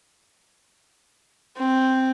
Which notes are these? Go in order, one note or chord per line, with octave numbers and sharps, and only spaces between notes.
C4